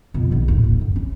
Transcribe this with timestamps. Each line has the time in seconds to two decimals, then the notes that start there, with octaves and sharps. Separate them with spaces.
0.14 F2 B2
0.32 A#1 D#3
0.48 D#1 A2
0.64 D2 A#3
0.81 F#2
0.96 C#4